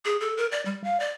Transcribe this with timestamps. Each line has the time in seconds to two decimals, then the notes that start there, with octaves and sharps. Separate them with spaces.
0.05 G#4
0.21 A4
0.37 A#4
0.52 D5
0.66 G3
0.84 F5
1.00 D5